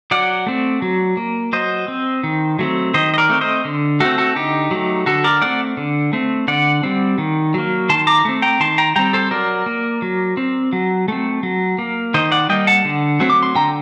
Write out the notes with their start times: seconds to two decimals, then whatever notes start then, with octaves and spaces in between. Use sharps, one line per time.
0.11 F#3 D5 F#5
0.46 A3 C4
0.82 F#3
1.17 A#3
1.53 F#3 C5 D#5
1.88 C4
2.23 D#3
2.59 F#3 A3 C4
2.94 D#3 C5 D#5
3.14 D#5
3.18 A#4 D5
3.29 A3 C4
3.41 C5 D#5
3.65 D3
4.00 A3 C4 F#4 A4
4.18 F#4 A4
4.36 D3 D#4 G4
4.71 F#3 A3
5.06 D3 F#4 A4
5.24 A#4 D5
5.42 A3 C4 D5 F#5
5.77 D3
6.13 A3 C4
6.48 D3 D5 F#5
6.83 G3 C4
7.18 D#3
7.54 F#3 A#3
7.89 D#3 A5 C6
8.07 A#5 D6
8.25 A3 C4
8.42 G5 A#5
8.60 D#3 A5 C6
8.78 G5 A#5
8.96 G3 C4 G5 A#5
9.13 A4 C5
9.31 F#3 A#4 D5
9.66 A#3
10.02 F#3
10.37 C4
10.73 F#3
11.08 A3 C4
11.43 F#3
11.78 A#3
12.14 D#3 C5 D#5
12.31 D5 F#5
12.49 G3 A#3 D#5 G5
12.67 F#5 A5
12.85 D3
13.20 F#3 A3 C4
13.30 D6
13.43 C6
13.55 D3 G5 A#5